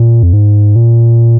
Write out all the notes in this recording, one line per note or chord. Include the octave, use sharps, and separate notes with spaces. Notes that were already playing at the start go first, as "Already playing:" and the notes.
Already playing: A#2
F2
G#2
A#2